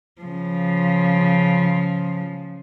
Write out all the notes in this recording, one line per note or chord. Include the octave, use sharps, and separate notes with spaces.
C#3 F3